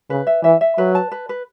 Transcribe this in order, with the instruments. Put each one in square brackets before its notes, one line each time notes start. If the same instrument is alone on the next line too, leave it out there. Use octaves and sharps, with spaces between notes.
[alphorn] C#3 [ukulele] B4
[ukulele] E5
[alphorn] E3 [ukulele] E5
[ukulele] E5
[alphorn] F#3 [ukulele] B4
[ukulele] A5
B4
B4